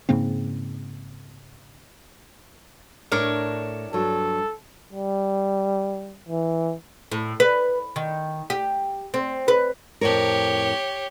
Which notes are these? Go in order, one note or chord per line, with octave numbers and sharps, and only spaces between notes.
G#2 C#3 A#3 C4
A2 D4 A#4 C#5
G2 F#3 A4
G3
E3
A2
B4
D#3
G4
C4
B4
F2 A2 G4 A#4 C#5